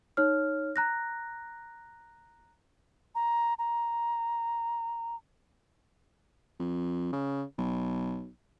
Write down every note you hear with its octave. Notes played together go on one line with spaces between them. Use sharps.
D#4 C#5 F6
A#5 F#6 A#6
A#5
A#5
F2
C#3
B1